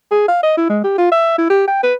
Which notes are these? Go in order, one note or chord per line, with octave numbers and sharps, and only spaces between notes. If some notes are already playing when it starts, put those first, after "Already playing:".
G#4
F5
D#5
E4
G#3
G4
F4
E5
E4
G4
G5
B4